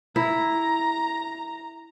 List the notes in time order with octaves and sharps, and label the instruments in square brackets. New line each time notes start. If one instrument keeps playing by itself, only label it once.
[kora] E4 [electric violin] A#5